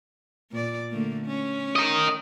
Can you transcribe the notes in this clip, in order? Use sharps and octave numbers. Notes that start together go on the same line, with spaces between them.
A#2 D5
D3 A3 A#3
C#4
A#4 D#5